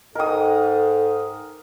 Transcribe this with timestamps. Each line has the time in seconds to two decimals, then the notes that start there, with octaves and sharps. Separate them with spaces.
0.15 G#2 A4 A#4 D#5 G5 D#6